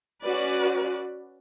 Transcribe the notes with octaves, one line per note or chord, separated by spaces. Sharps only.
C#4 F#4 B4 D5